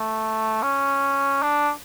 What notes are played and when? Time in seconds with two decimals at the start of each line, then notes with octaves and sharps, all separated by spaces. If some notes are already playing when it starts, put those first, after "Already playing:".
Already playing: A3
0.62 C#4
1.43 D4